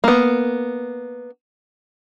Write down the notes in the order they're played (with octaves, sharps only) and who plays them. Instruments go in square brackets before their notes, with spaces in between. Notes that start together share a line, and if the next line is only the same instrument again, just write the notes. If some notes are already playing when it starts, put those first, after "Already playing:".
[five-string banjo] A#3 B3